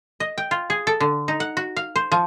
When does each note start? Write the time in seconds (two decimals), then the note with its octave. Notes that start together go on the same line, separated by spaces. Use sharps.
0.20 D#5
0.38 G5
0.51 F4
0.70 G#4
0.87 A4
1.00 D3
1.28 D#4
1.40 F#5
1.57 F#4
1.77 F5
1.96 C5
2.12 F3